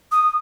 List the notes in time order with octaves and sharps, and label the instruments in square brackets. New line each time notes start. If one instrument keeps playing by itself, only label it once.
[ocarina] D#6